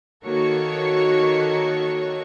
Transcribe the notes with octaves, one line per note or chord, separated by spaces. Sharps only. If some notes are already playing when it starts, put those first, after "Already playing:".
D#3 A#3 F#4 A4 C#5 C#6